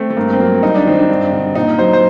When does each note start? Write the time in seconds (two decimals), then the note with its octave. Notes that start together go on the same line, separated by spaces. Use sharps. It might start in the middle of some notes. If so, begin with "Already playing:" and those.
Already playing: A3 C4
0.10 A3
0.17 G2 A#3
0.33 C4
0.40 F#3 A#3
0.63 G2 D#4
0.75 D4
0.86 D#3 C4
0.99 D4
1.09 G2
1.33 D3
1.55 A#2 D#4
1.79 F#3 C5
1.93 C5